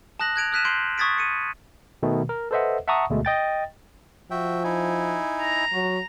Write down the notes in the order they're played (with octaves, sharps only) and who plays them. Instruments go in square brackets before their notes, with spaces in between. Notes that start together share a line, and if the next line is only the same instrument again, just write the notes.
[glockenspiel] A5 D#6 F#6 A#6 F#7
F#6 G#6 D7 F7
D#6 F6 F#6 B6 D#7 E7
C6 G6 C7 D7 F#7
C#6 D#6 G#6 A6 B6 D7
C#7 D#7
[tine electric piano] B2 D#3 A3
A#4
A4 B4 C5 D#5 E5 F#5
E5 F#5 A5 A#5 C#6 D#6
D2 B2 G#3 A3
D#5 G5 A6
[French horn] F3 [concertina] F#4 E5 G5
[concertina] D#4 E4 G#5
[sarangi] A#5
[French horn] F#3 [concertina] F#4